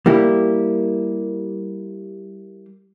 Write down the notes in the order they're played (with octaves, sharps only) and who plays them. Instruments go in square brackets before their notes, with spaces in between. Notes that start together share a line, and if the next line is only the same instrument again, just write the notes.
[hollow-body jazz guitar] G3 A#3 E4 G4